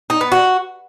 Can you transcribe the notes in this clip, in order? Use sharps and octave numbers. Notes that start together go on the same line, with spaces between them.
D#4
B3
F#4